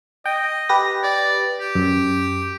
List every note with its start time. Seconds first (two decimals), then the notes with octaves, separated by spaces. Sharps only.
0.26 D#5 G5
0.69 G4 B4 A#6
1.03 D5
1.61 G4
1.75 F#2